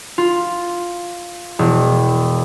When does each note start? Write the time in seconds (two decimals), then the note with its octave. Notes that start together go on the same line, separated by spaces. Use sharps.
0.18 F4
1.59 E1